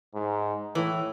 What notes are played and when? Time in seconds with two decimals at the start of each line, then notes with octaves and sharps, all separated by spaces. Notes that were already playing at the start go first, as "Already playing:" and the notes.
0.15 G#2
0.75 A2 E3